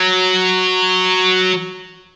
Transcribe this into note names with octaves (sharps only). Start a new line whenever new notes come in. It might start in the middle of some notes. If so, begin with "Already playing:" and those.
Already playing: F#3